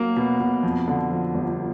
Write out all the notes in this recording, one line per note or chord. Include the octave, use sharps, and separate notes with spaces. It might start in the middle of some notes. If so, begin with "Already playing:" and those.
Already playing: F#3 A#3
B2
B2
F2
D3
F3
G1